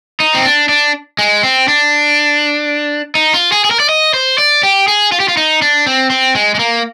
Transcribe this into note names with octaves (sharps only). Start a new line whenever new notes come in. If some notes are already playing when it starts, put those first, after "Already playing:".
D#4
C4
D4
D4
G#3
C4
D4
D#4
F4
G#4
G#4
A#4
D5
D#5
C5
D5
G4
G#4
F4
G4
F4
D#4
D4
C4
C4
G#3
G#3
A#3